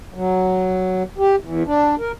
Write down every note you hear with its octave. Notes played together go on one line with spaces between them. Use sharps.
F#3
G4
E2
D4
A#4